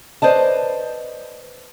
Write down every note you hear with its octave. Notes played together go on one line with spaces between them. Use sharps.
B4 C5 D5 D#5 A5